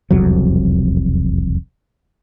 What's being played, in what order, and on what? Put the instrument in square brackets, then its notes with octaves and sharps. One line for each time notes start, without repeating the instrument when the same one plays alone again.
[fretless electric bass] E1 C2 F2 F#3